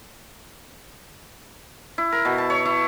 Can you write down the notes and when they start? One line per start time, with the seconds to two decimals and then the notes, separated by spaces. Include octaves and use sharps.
1.98 E4
2.12 A#4
2.25 B2
2.38 A5
2.50 C#5
2.65 E4